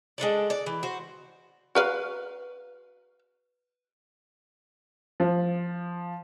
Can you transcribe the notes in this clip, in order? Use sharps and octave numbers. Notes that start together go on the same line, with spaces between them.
G#3 D4 A4 D5
D5
E3
F#4 C5
F#4 B4 F5
F3